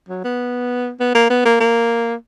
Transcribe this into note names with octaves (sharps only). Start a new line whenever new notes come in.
F#3
B3
B3
A#3
B3
A#3
A#3